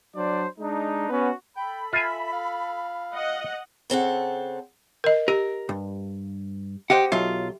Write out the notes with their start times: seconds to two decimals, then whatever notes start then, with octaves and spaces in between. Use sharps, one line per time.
0.15 F#3 D4 C5 D5
0.59 G#3 D4 D#4
1.08 B3 C#4 F#4 B4
1.56 A4 G5 B5
1.93 F4 E5 G#5
2.33 F5
3.15 D#5 F#5
3.90 C#3 C4 A4 F#5
5.04 A#4 D#5
5.28 G4 A#4
5.69 G2
6.90 G4 C5 D#5 F#5
7.12 B1 F#3 F4 E5